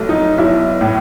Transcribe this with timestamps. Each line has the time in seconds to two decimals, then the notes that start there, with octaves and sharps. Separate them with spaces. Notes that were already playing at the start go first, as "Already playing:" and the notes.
Already playing: B1 A3
0.09 D#4
0.38 B1 E4
0.81 A2